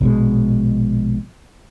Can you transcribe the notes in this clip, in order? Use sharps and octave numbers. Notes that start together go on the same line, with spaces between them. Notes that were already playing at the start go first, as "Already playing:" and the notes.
A#1 B2 G#3